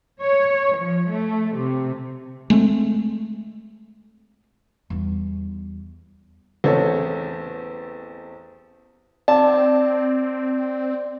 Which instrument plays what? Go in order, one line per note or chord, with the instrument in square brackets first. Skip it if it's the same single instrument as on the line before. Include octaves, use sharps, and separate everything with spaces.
[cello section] C#5
F3
A3
C3
[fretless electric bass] G#3 A3 C4
[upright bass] E2 G3
[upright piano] A1 E2 C4 A4 C#5
[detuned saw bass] C4 [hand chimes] D5 [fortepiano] A5